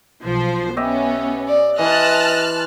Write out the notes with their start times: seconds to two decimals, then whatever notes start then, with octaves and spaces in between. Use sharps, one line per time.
0.24 B1 F3 C5
0.77 B3 C#4 G4 D#5 E5
1.48 D5
1.78 E3 D#5 A5 C6 F6 F#6